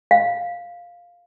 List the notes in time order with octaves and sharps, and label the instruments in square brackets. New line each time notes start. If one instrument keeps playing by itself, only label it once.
[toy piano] F5